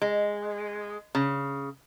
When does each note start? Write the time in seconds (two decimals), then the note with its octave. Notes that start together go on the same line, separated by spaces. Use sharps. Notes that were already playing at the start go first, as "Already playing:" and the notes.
0.02 G#3
1.15 C#3